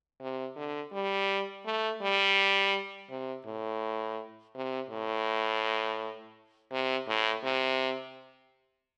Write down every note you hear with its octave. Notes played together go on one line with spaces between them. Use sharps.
C3
D3
G3
A3
G3
C3
A2
C3
A2
C3
A2
C3